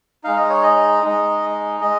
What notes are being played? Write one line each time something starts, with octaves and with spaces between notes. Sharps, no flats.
G#3 D#4 F5
D#5
C#5
D#5
G#3 D#4
G#3 D#5